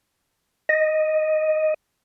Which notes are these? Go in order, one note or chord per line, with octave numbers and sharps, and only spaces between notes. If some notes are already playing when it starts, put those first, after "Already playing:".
D#5